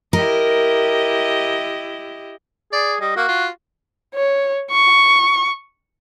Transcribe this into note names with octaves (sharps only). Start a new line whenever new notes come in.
E4 G4 A#4 D#5
G#4 D5
G3 D#5
A#3 F#4
F4
C#5
C#6